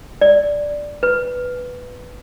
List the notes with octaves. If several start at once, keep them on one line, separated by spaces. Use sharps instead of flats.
D5
B4